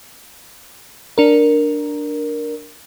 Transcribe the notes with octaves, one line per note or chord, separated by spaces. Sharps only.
D4 A#4